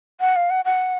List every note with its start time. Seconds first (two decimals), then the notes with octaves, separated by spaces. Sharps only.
0.20 F#5
0.36 F5
0.50 F#5
0.65 F#5